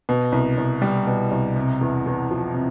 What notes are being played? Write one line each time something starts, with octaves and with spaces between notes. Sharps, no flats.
B2
C2
C2
G3
B2
C2
C3
E2
E2
F3
C3